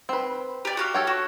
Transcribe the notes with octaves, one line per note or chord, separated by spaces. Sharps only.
C4 B4
G4 D5
F#4 G4 F5
A4 C#5 G5
F#4